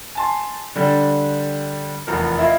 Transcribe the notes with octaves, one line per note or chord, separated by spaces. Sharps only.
G#5 A5 C6
D3 G3 D4
F1 E2 F3 B3 A#4
E4 F4 D#5